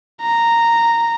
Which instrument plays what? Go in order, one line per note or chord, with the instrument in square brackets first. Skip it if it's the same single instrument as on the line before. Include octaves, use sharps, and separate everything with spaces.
[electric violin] A#5